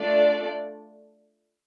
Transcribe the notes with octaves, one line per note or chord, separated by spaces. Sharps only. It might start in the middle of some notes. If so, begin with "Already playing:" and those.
Already playing: A3 D4 F4 A4 D5